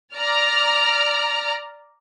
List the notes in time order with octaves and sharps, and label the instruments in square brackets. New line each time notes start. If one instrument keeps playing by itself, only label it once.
[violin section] D5 A#5 F6